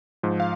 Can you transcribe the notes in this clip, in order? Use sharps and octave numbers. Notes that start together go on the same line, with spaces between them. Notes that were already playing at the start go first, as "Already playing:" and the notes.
G#2 F3
F5